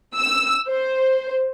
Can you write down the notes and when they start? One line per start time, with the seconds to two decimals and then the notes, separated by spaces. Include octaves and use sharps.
0.18 E6
0.69 C5